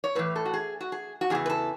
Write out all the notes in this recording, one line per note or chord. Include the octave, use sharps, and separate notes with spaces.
C#5
A2 E3 B4
A4
F#4
G#4
F#4
G#4
F#4
E2 C#3 E3 G#4
B4
A4